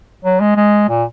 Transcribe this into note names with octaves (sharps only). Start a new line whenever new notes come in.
F#3
G#3
G#3
A#2